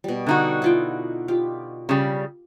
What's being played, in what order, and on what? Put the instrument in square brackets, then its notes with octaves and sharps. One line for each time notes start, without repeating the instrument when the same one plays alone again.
[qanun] B2 G3
[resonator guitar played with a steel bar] D3 D#4 F#4
[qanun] E4 F4 G5
F4 G4
[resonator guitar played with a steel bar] C#3 G3